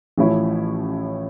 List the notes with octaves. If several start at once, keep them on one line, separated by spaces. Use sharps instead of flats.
A1 A2 F3 C#4 E4